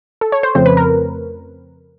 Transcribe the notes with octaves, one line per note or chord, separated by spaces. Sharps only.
A4
C#5
C5
F2 C#3 F3 A3 C4 C5
B4
A#4